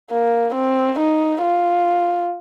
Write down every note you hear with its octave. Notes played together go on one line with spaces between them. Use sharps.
A#3
C4
D#4
F4